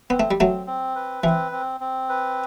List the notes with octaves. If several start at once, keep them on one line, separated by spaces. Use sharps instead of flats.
B3 C4
A3
G3
F#3 A3 C4
C4
B4
E3 C4
C4
C4
B4